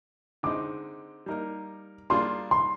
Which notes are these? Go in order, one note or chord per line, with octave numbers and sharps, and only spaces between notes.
D3 G#3 C4 D#4 D6
G3 A#3 D#4 A#4
G3 A#3 D4 F4 G#4 C6
C6